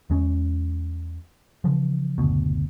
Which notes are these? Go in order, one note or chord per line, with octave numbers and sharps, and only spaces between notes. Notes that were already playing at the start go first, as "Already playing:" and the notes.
E2 G#3 C#4
C#3 E3 F3
F#1 D2 B2